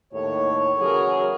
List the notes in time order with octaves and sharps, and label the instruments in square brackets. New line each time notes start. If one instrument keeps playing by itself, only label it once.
[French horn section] D#2 A2 [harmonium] C#5
[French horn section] E2 C#3 F#3 [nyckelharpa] G#4 A#4